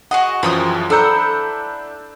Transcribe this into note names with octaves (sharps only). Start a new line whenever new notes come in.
F#4 G#4 D#5 F#5
F#2 E3 F3 G#4 G5 D#6
D4 E4 A4 C5 F#5 A#5 E6 G6